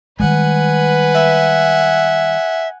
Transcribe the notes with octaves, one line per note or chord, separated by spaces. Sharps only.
D#3 G3 G#3 B4 F#5 G#5
E5